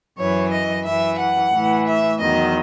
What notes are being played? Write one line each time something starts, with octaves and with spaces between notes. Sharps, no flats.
F#2 E3 C#5
D#5
F#2 E3 E5
F#5
A2 E3
E5
E2 D#3 F#3 D#5